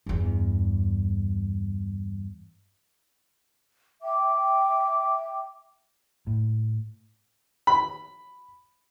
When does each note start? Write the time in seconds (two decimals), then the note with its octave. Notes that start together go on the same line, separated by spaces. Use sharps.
0.06 E2 G2
4.02 E5 G5 D6
6.27 A2
7.67 B5